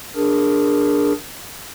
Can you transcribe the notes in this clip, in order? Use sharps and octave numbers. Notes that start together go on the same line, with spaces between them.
D4 G#4 A#4